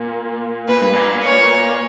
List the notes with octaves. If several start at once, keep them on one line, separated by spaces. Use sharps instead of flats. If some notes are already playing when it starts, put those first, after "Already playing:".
Already playing: A#2
A#2 B4
G2
A#2
C#5